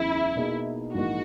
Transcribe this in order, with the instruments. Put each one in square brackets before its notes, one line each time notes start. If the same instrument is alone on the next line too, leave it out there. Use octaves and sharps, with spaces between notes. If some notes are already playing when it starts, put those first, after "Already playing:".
Already playing: [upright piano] F#1 E2 C#3 [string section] E4
[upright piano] B2 A#3 D#4 G#4
[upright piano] A#1 G#2 E3 A#3 D#4 [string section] F#4